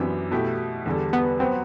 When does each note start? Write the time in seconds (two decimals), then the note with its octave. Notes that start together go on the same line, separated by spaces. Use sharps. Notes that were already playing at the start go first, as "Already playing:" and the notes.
Already playing: F#2 E3 B3 C4 D4 G4
0.31 B2 A3 E4 G4
0.86 E2 D3 G3 D4 A4
1.13 B3
1.39 F#3 B3 C4 F#4